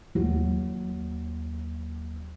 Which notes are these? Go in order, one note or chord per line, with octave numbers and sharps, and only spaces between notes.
D#2 F#3